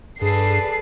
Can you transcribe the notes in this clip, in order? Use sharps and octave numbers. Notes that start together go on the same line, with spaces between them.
G2 G#4 A4 B4 D5 A5 C7